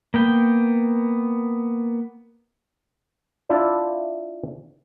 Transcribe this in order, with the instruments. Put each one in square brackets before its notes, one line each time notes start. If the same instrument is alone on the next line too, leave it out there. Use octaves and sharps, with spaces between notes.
[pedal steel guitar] A#3 B3 G5
[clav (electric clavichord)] D4 E4 F4 D5 E5